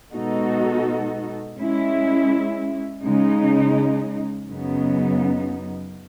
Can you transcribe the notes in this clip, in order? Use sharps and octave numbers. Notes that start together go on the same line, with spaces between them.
B2 G#3 D#4 F#4 A4
G#3 C#4 E4
C#3 G#3 D#4
F#2 C#3 F#3 B3 D#4